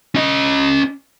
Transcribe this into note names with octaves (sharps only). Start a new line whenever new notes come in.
C#4 D#5